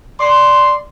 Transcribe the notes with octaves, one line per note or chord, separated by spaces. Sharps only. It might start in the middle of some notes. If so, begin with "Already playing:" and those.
D5 C6